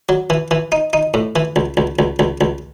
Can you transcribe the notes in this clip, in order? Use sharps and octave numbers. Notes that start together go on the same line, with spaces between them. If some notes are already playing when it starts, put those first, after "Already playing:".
F#3
E3
E3
D#4
D#4
A2
E3
C#2
C#2
C#2
C#2
C#2